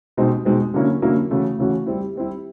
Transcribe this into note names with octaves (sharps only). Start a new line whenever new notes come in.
B2 G#3 C4 D#4
B2 G#3 C4 D#4
D3 F#3 A#3 C#4 E4
D3 F#3 A#3 C#4 E4
C#3 E3 A3 C#4 F#4
C#3 E3 A3 C#4 F#4
G3 C4 E4
G3 C4 E4